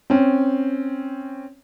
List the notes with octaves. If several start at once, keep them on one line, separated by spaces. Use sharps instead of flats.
C4 C#4